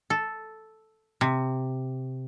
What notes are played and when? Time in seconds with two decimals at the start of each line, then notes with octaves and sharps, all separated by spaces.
0.10 A4
1.21 C3